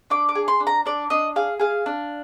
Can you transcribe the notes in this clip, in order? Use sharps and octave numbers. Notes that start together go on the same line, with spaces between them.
D4 D6
D6
G#4
C6
D4
A#5
D4 D5
D4 D#5
G#4 F5
G#4 F5
D4